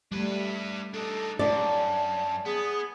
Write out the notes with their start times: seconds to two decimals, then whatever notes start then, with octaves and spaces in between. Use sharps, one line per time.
0.12 G3 A3 D4 B4
0.94 D4 D#4 A4
1.39 F#2 D4 D5 A5
2.45 B3 G#4